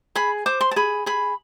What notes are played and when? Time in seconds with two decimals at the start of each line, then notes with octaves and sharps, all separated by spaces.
0.16 G#4 B5
0.46 C5 D6
0.61 C6
0.71 A5
0.76 G#4 B5
1.06 G#4 B5